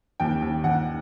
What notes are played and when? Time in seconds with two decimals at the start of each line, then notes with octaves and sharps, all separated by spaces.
0.20 D#2 G5
0.42 D#2
0.64 D#2 F#5